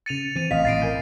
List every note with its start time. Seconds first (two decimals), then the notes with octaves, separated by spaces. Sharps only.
0.06 C#3 A6 C#7 D#7 F7
0.36 E3 C4 D#7 F7
0.51 A1 D#5 F5 B6
0.65 A1 A6 C7 D7
0.82 A#4 G#5 G6